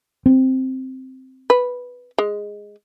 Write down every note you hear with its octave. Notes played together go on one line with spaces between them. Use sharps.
C4
B4
G#3